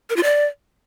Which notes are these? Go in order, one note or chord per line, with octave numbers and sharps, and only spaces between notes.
A#4
F4
D5